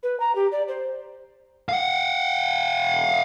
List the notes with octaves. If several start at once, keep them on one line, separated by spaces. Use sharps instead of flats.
B4
A#5
G4
D5
C5
F5 F#5